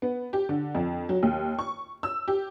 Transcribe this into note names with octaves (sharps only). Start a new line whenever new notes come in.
B3
G4
D3
F2
F#3
D#2
C#6
E6
G4